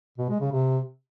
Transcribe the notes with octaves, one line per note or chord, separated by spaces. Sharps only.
B2
G#3
C#3
C3